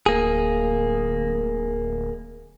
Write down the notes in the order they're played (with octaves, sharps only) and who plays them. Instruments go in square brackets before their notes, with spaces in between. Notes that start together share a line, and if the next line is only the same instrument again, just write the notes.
[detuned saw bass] D1 [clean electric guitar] A#3 G#4